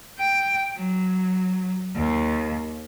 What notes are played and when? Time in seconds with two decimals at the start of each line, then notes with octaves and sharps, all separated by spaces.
0.19 G5
0.78 F#3
1.96 D#2